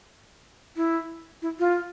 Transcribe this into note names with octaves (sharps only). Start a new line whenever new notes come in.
E4
E4
F4